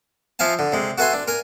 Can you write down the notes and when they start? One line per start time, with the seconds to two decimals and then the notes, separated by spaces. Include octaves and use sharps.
0.39 F3 E5 F5 G#5 A5
0.59 D3
0.72 C3 G#3
0.98 F#4 A4 B4 E5 G#5 C6
1.13 D4
1.28 A#4 G#5